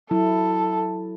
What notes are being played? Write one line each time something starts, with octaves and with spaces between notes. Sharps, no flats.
F#3 E4 A4